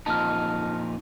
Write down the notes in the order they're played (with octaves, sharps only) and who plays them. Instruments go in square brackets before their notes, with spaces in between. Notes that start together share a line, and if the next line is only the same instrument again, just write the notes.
[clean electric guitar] F2 A#2 D#4 [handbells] A5 F6